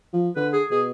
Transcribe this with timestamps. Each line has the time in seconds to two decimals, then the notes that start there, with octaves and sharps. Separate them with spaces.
0.13 F3
0.36 D3 B4
0.53 G#4
0.70 B2 G#4